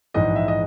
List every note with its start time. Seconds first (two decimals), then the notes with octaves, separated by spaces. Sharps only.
0.14 A#1 G#2 E3 G#3 D#5
0.36 E5
0.48 D#5